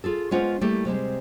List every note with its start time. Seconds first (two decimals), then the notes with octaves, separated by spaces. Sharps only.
0.04 F4 G#4 A4
0.31 G#3 B3 C#4 F4 C5 F#5
0.61 G3 A3 A#3 E4 G4 A4
0.85 C3 G3 G#3 C4